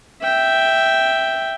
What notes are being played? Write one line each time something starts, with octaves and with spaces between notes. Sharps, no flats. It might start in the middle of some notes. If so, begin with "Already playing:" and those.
E5 G5